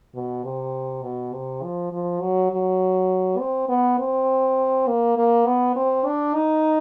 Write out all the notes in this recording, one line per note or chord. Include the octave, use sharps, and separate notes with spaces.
B2
C3
B2
C3
F3
F3
F#3
F#3
C4
B3
C4
A#3
A#3
B3
C4
D4
D#4